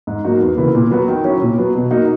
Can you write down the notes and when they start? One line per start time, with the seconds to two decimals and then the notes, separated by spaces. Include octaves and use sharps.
0.07 G#2
0.24 F#3 A#3 D#4 F#4
0.40 E2
0.57 C#3 E3 A#3 E4
0.75 A#2
0.91 F#3 B3 F#4
1.08 D#3
1.24 F#3 C#4 E4
1.42 A#2
1.58 F#3 B3
1.75 B2
1.91 A#3 D#4 F#4